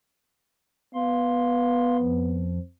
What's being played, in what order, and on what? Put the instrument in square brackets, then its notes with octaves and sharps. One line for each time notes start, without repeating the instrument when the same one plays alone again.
[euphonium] B3 [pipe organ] F5 C6
[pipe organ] F2 F3